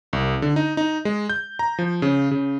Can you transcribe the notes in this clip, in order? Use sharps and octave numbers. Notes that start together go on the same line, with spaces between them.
C2
D3
D#4
D#4
G#3
G6
A#5
F3
C#3
C#3